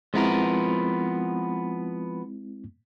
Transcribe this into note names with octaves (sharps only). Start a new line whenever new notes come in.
F3 G#3 B3 C4 E4 A#4